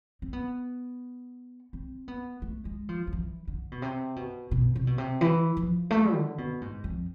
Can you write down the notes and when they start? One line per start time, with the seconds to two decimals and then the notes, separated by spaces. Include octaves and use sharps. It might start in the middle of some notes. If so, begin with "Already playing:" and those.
0.22 C4
0.33 B3
1.73 C4
2.08 B3
2.42 A3
2.65 G#3
2.89 F3
3.07 F3
3.13 E3
3.47 D3
3.72 B2
3.82 C3
4.16 B2
4.51 B2
4.75 C3
4.87 B2
4.98 C3
5.21 E3
5.57 F3
5.90 A3
6.14 D3
6.38 B2
6.61 G#2
6.84 F2